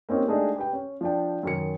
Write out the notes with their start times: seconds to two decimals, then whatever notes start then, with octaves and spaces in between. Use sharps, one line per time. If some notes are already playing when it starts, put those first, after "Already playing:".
0.09 A#3 C4 C#4 D#4 G4
0.28 G#3 A3 D4 D#4 G4 G#4
0.56 G4 B4 G5
0.73 C#4
1.01 F3 D4 G5
1.43 F#2 D#3 C#7